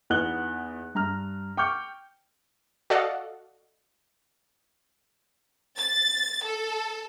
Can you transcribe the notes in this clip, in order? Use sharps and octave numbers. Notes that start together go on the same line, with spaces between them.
E2 B3 D#4 F#6 G7
G2 A#5 F6
G5 C#6 D6 F6 G6 C#7
F#4 A4 D5 D#5 F5 F#5
A6
A4